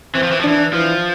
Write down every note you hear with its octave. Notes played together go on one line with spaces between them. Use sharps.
E3 C4
F3
E3
F3
E3 D4
E3 F3